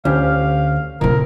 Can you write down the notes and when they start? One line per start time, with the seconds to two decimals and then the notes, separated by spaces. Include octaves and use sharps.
0.05 D2 C#4 G4 C5 F5
1.01 F2 C#3 F4 A#4